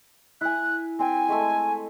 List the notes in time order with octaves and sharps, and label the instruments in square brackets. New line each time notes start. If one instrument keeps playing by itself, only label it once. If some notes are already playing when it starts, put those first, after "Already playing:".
[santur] E4 G#5 [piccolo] F#6
[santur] C4 G5 [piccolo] G#5
[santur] G#3 A3 A4